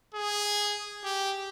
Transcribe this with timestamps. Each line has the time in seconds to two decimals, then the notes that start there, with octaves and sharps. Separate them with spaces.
0.14 G#4
1.04 G4